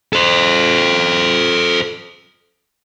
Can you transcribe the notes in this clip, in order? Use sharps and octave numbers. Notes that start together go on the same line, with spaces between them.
A4 C5